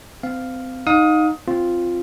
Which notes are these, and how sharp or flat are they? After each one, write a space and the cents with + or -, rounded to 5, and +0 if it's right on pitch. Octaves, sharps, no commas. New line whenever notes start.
C4 -30 F5 +0
D#4 +0 F5 +40 D#6 +15
C4 +0 F4 +0